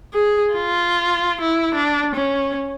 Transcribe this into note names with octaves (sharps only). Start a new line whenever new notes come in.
G#4
F4
E4
D4
C#4